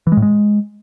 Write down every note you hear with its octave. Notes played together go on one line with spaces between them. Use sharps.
E3
G#3
A2
G#3